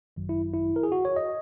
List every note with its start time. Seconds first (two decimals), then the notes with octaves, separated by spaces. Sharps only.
0.16 G#1 F#2 D#3 F#3
0.29 E4
0.54 E4
0.76 A#4
0.83 G#4
0.92 F#4
1.05 C#5
1.16 D#5